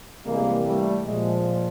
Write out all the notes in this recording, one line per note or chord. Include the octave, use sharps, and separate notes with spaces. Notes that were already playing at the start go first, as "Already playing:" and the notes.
C3 E3 G3 G#3 A#3
G3 A3
A#2 F3 G#3